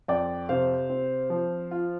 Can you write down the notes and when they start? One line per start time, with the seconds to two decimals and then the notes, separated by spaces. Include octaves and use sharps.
0.08 F2 D5 G5
0.49 C3 C5 F5
0.90 C4
1.30 F3
1.71 F4